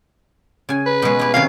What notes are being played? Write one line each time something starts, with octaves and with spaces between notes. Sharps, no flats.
C#3 G#5
B4
B2 G#3
E4 G4
C3 D#3 C#4 F5